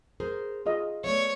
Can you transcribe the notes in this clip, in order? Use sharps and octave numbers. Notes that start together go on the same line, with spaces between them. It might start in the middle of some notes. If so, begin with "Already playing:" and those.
G#4 A#4 C5
F4 G#4 D#5
A3 B3 C#5 D5